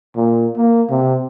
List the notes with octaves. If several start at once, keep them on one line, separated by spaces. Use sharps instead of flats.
A#2
A#3
C3